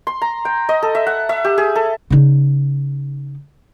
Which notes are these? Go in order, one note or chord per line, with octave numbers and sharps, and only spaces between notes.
C6
A#5
G5
D#5
A4
E5
F#5
E5
G4
G#4
A4
C#3 D#4